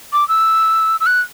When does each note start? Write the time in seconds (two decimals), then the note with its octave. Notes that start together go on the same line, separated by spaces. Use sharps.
0.13 D6
0.29 E6
1.00 E6
1.06 F#6